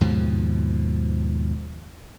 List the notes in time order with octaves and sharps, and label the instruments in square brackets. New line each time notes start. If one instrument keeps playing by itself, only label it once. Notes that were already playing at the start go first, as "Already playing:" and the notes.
[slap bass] D#2 G#2 B2 F3